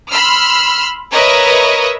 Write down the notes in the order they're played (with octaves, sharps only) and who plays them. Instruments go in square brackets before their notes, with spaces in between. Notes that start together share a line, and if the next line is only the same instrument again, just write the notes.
[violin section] B5 C6 E6 F6
A#4 B4 C#5 D#5 E5